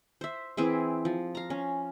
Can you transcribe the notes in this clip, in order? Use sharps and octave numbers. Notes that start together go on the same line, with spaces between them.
C5 E5
E3 C4 G#4 E5
F3
F5 A#5
C#4